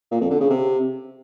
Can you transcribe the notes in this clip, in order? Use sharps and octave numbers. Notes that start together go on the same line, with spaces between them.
A#2
F2
D3
C#3
C3